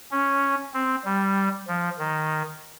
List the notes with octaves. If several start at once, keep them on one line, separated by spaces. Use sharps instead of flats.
C#4
C4
G3
F3
D#3